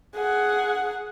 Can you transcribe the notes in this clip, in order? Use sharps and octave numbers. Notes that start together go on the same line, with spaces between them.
G#4 F#5